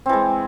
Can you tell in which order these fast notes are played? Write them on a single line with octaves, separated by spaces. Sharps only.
C4 E3 G#3